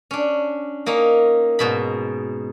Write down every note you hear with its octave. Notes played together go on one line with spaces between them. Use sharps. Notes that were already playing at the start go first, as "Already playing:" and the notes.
C#4 D4
A#3 C#4 D#4
G#2 B2 B5